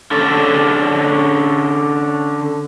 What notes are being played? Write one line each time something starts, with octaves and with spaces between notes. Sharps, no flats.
D3 C#4 A4